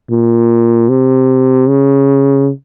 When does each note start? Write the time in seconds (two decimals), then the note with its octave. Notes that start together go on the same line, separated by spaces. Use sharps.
0.10 A#2
0.89 C3
1.69 C#3